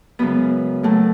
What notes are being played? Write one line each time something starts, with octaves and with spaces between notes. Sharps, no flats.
F#2 C#3 G#3 B3
A2 F#3 A3